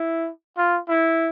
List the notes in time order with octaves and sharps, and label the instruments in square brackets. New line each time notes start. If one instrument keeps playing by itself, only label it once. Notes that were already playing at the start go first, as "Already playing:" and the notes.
Already playing: [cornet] E4
F4
E4